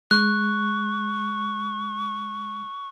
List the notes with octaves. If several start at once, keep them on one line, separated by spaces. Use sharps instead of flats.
G#3 C#6 F#6